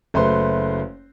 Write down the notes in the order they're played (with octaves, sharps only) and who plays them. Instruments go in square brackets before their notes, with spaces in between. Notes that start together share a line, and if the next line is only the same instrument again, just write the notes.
[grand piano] F#1 A3 B4 C5 C6